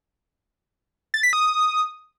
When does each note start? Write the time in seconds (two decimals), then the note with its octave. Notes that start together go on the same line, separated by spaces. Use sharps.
1.14 A6
1.23 B6
1.33 D#6